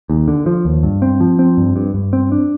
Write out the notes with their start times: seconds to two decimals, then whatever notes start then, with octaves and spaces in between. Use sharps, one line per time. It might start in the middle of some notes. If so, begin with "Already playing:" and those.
0.10 D#2
0.28 D3
0.46 F3
0.65 D#2
0.83 G2
1.02 C4
1.20 F3
1.39 C4
1.57 G2
1.76 G2
1.94 G2
2.13 C4
2.32 D4